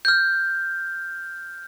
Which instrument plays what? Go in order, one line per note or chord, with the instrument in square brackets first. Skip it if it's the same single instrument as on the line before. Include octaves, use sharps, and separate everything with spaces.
[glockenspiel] F6 G6